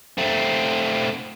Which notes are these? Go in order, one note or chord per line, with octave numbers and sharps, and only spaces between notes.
A3 C4